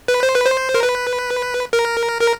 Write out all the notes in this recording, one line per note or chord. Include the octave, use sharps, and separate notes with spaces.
B4
C5
B4
C5
A#4
B4
A#4
A#4